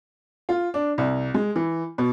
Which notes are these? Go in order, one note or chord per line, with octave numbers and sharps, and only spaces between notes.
F4
D4
C2
G#3
E3
B2